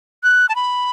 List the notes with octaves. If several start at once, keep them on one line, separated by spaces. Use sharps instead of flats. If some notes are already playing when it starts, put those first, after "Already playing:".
F#6
A5
B5